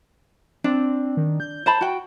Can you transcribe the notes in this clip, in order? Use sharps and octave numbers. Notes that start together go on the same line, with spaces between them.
C4 D4
D#3
G6
C5 A5 B5
F#4 G5